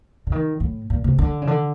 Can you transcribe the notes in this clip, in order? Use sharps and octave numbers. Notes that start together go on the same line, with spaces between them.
D3
D#3
A2
A#2
C3
D3
C#3
D3